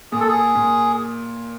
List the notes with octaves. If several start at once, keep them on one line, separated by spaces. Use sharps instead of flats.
A#2 G#4
A4
G#4
A#2